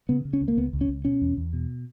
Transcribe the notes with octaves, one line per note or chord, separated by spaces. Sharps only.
C#3 B3
C#3
C#4
C#2
A#3
C#2 B3
C#2
C#4
C#2
B2 C#4
E2
E2
B2